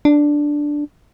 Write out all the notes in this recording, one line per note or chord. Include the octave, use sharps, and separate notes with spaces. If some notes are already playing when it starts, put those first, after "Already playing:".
D4